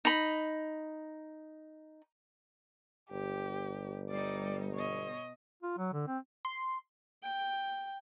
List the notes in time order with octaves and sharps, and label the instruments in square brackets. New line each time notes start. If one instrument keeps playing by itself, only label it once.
[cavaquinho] D#4 B5
[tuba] G1 [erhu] G4
[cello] G3 D#4 [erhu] D5
[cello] B2 D#5 [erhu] C#5
[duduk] F4
F#3
D3
C4
[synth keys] C6
[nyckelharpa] G5